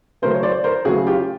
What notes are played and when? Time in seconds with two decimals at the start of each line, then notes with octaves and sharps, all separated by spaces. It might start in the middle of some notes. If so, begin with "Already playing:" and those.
0.22 C#3 F#3 A3 C#4 A#4 C5
0.34 C#5
0.43 C5 D5
0.64 A#4 C5
0.85 C#3 F#3 A3 C#4 F#4 G#4
1.06 F4 G4